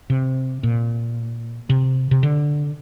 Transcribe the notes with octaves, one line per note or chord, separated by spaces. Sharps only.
C3
A#2
C3
C3
D3